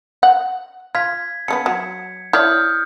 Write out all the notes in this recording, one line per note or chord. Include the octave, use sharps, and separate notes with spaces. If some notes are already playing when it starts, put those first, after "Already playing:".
F#5
F4 G#6 B6
C#3 A3 B3 C#7
F#3
E4 C#5 D5 D#6 F6 G6